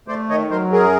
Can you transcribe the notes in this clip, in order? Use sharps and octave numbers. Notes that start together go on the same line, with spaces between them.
A3 C5 D5
D#3 C#5 D#5
F#3 A#4 C5
F#2 G#4 A#4